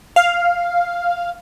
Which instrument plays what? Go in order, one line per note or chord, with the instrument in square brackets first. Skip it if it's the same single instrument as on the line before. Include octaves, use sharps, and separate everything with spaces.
[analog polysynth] F5